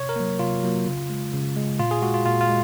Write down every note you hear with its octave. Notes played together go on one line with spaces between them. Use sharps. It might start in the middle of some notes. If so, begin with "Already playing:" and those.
Already playing: C3 C#5
A#4
F#3 A#3
C3 F4
F#3 A#3
C#3
G#3
C#3
G#3
A#2 F4
G#4
G#3 F#4
F4
A#2 F4
F4
G#3